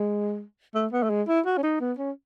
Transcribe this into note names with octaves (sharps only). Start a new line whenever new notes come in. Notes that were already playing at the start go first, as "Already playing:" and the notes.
Already playing: G#3
A3
B3
A3
G#3
E4
F#4
C#4
D#4
B3
C#4